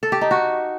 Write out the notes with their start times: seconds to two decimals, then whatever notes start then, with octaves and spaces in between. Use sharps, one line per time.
0.03 A4
0.12 G4
0.21 D#4
0.31 F#4